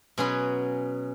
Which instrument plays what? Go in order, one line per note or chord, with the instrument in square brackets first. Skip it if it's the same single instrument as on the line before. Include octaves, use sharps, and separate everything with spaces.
[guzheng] B2 F#3 C#4 G#4 B4 C6